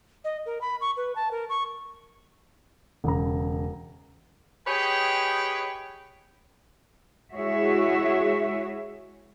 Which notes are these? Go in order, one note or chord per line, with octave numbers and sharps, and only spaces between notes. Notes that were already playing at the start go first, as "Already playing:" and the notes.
D#5
A#4
B5
C#6
B4
A5
A#4
C#6
E1 C#3 A#5
G4 G#4 B4 C#5 D#5 G5
G#3 E4 F#4 G#4 C#5 E5